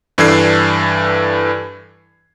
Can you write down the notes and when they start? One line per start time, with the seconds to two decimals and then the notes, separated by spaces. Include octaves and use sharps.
0.18 G2 E3 D4 A4 G#6 C7